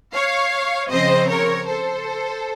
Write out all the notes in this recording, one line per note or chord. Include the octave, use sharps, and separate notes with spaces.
C#5 F5
C#3 F3 C4 C5 D#5
A#4 C#5
A4 C5